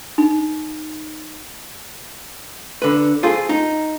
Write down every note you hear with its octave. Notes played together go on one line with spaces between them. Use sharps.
D#4
D3 B4
F4 G#4 A4 C5
D#4